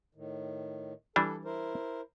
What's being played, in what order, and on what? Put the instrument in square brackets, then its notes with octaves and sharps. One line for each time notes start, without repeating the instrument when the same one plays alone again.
[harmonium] A2 D#3
[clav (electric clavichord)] E3 G3 D4 [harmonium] A4
[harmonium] E4 A#4 C5